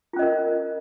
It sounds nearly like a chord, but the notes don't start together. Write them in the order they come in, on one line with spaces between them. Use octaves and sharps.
F4 C#4 D#5 A#4